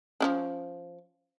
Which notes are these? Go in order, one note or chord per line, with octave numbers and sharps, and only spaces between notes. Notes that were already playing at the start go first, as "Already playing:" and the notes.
F3 C#4 D4